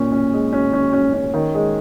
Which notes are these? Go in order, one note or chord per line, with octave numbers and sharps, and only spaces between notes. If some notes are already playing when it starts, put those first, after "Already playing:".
Already playing: A#2 C#4
C#4
G#3
C#4
C#4
C#4
C#4
D#3
G#3